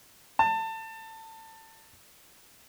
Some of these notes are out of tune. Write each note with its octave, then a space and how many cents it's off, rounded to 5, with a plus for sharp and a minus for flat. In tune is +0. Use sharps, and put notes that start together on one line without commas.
A5 +25